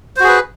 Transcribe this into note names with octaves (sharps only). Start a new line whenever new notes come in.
F#4 G#4 B4 C5